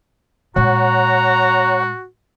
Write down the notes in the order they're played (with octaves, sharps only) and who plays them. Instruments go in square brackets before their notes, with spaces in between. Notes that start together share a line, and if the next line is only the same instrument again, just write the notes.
[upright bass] A#2 G#3 [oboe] F#4 [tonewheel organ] C#5 F#5 [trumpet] A#5